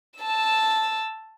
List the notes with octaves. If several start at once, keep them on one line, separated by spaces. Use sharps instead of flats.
A5 E6